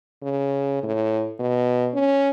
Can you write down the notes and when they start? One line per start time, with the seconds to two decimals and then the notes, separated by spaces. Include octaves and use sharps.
0.22 C#3
0.83 A2
1.40 B2
1.94 C#4